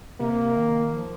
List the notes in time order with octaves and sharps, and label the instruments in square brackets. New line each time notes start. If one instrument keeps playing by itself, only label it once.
[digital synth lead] C3 [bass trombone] A#3
[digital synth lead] D#3
F3